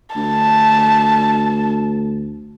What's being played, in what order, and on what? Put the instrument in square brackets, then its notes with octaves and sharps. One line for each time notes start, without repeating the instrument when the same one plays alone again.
[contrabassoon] D2 [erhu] A5